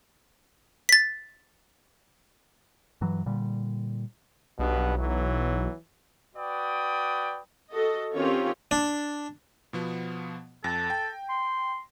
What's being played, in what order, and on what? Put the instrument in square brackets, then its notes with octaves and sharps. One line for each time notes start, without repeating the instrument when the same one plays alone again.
[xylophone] A6 B6
[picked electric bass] G2 E3 F#3
A#2 D3 G3
[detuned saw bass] B1 [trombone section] G2 B2 B3
[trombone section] E3 F#3
[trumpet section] F#4 B4 D5 G5 D#6
[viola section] F#4 A4 D#5
D#3 C4 C#4 F4 G4 C#5
[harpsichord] D4
[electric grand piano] B2 F3 B3
[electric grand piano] F2 A#6 [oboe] A4
[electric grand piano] G5
[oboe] C6